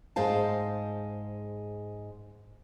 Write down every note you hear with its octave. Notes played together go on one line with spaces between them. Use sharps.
G#2 G#3 C5 F5 A5